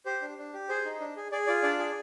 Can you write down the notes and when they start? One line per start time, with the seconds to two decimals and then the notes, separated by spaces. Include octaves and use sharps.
0.06 G4 C5
0.22 D4
0.38 D4
0.54 G4
0.69 G#4 C5
0.85 D#4
1.00 D4
1.17 G#4
1.32 G#4 D5
1.47 F4 D5
1.63 D4 D5
1.79 G#4